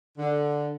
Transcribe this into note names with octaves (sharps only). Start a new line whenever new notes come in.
D3